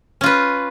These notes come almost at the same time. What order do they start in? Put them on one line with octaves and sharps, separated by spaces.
C#4 F4 B4